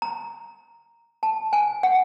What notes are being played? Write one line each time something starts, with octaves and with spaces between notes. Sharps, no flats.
A#5
A5
G#5
F#5